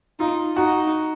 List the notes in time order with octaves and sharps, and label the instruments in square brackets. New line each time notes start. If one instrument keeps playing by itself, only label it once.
[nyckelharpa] D#4 [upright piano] F4
[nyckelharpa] D#4 [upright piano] F#4